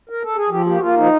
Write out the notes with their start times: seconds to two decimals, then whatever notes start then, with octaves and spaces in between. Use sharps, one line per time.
0.09 A#4
0.23 A4
0.36 G#4
0.49 F3 G4
0.66 A#3 G4
0.77 F#4
0.81 A#3 F4
0.97 F3 D#4